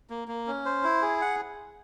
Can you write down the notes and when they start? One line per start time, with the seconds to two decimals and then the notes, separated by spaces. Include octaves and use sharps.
0.10 A#3
0.28 A#3
0.47 C#4
0.65 C5
0.84 E4
1.02 G#4
1.21 F#5